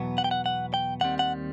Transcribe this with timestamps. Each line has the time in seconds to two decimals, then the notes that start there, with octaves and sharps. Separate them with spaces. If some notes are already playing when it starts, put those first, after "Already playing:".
Already playing: E2 B2 F#3 B3
0.18 F#5
0.24 G5
0.31 F#5
0.46 F#5
0.74 G5
1.01 D#2 D#3 G3 C4 F#5
1.19 F#5